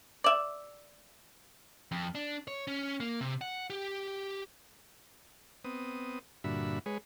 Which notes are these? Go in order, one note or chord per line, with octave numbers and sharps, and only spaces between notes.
D5 E5
F2
D4
C#5
C#4
A#3
C3
F#5
G4
B3 C4 D#6
G2 A#2 D3 F#4 E5 B5
G#3 G#4 B4 C#5